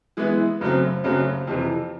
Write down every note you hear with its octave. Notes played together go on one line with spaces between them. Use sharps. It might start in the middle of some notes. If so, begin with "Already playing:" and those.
E3 G#3 B3 E4
F#2 C#3 F#3 A3 C4
F#2 C#3 F#3 A3 C4
F2 C3 E3